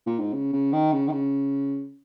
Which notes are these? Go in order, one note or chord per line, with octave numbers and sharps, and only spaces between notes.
A#2
G#2
C#3
C#3
D#3
C#3
D#3
C#3